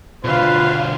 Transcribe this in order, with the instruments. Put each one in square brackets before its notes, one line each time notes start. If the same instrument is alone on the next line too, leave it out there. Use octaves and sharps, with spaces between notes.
[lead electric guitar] B2 D3 [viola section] F4 C5 F5 [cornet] B4